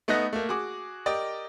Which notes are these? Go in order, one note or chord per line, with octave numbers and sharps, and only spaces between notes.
A3 B3 D#4 D#5 F#6 A#6
A3 A#3
F#4 G#4 D6
G4 A#4 D5 D#5